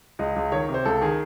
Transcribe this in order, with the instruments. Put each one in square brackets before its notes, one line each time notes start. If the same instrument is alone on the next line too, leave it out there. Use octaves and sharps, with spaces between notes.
[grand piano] C#2 D#5
C#2
D#3 C#5
C3
C5
C#2 A4
D#3 G#4